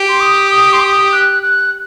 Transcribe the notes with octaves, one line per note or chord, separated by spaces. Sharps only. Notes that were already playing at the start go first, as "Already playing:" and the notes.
Already playing: G4
C6
D#6
D#6
C6
D#6
F#6
F#6